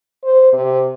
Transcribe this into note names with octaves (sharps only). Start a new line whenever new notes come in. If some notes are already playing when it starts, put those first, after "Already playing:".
C5
C3